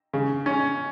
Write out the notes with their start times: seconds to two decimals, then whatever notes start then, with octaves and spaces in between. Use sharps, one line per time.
0.13 C#3
0.46 C#4